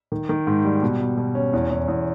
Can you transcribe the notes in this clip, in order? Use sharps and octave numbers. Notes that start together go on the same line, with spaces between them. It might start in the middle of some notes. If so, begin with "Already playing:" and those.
D#3
D#3
G#2
G3
B2
B2
B2
C#4
E2
E2
E2